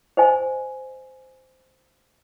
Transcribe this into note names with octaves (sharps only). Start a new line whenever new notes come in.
C5 D#5 G#5